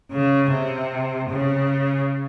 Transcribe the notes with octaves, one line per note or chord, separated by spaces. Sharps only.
C#3
C3
C#3